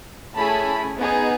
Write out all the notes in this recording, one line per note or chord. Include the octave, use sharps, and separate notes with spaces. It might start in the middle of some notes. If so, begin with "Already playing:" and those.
A3 C#4 E4 G#4 A5 B5
B3 D#4 G#4